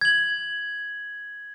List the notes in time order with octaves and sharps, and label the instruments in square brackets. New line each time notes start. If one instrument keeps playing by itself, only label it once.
[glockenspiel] G#6 F#7